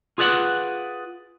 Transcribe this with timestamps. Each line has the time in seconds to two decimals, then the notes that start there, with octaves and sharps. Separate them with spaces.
0.18 F4 G#4 B4 D5 F#5